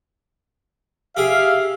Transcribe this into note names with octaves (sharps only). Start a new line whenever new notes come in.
G4 G#4 E5 F5